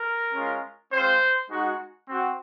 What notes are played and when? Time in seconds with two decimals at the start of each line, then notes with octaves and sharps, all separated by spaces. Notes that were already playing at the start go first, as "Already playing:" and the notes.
Already playing: A#4
0.33 G#3 C#4 F4
0.92 G#3 C4 F4 C5
1.50 G#3 D#4 F#4
2.08 C4 F#4